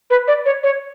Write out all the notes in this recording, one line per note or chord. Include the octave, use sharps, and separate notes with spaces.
B4
D5
C#5
C#5